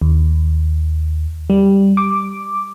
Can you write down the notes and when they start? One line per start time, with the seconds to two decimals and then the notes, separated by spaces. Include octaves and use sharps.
0.01 D#2
1.50 G3
1.97 D6